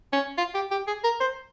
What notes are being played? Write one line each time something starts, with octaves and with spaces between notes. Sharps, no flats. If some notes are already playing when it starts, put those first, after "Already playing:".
C#4
F4
G4
G4
G#4
A#4
C5